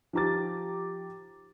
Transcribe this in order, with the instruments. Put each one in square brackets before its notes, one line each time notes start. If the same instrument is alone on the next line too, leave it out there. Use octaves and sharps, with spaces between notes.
[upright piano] F3 D#4 G4 A#5 D6 A6